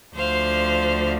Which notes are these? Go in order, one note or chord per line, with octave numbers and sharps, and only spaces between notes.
D2 D3 F3 C5 F5